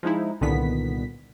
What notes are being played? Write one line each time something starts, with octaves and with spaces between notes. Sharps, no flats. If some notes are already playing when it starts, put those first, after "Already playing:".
F3 G#3 D#4 E4
C2 A#2 D3 D#3 B3 B6